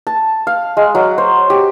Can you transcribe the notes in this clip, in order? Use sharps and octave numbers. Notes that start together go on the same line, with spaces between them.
A5
F5
G#3
F#3
C5
G4